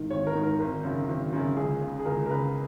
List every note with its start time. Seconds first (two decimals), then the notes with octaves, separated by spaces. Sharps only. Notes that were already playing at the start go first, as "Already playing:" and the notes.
Already playing: G#1 G#2 D#3
0.10 G#1 C#5
0.27 A#4
0.34 G#2 D#3
0.43 A#4
0.59 G#1 A#4
0.84 F#2 C#3
1.09 G#1
1.32 F#2 C#3
1.57 C#2 G#4
1.81 C#3
1.99 G#4
2.05 C#2 A#4
2.26 A#4
2.30 C#3 B4